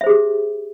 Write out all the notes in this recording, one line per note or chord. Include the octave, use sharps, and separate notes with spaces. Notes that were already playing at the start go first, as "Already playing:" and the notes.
G4 G#4 C5 E5